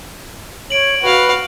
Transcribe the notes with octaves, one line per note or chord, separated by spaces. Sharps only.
C#5 D7 F#7
F#4 B4 F5